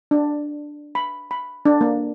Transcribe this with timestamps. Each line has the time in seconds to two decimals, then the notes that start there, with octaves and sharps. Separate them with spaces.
0.11 D4
0.95 B5
1.31 B5
1.65 D4
1.81 A#3